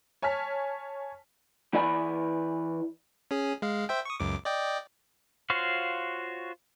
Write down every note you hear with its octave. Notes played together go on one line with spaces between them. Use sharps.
C#5 G#5 A5 F6 B6
E3 E4 D5 G#5 A5 B5
C#4 G#4
G#3 F5
C5 E5 G5
C#6 D#6
C#2 F#2 D6
D5 D#5 G5
F4 F#4 C5 C#5 F5